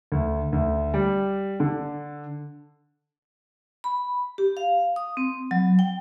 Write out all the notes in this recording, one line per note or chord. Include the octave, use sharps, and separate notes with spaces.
D2
D2
G3
D3
B5
G4
F5
D#6
C4
F#3
G5